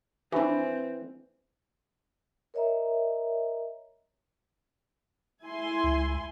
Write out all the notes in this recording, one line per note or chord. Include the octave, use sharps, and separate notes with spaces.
E3 C4 D4 F#4
A#4 C#5 D#5 E5 A#5
E4 G#5 C6
C#2